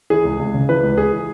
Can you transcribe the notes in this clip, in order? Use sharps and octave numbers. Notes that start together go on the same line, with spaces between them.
E3 G#4
C#2
C#2
C#3
E3 B4
C#2
C#2 G#4
E3